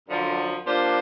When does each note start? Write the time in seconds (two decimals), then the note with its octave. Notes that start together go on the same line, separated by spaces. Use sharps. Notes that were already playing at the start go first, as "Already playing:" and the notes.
0.09 F#2 D3 F3
0.66 F3 A#3 D4 G4 C5